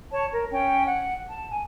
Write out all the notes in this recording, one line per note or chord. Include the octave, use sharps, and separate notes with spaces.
C#5 A5
A#4
C#4 C#5 G5
F#5
A5
G#5